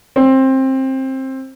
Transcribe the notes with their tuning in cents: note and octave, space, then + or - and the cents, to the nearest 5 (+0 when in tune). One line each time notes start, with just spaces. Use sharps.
C4 +20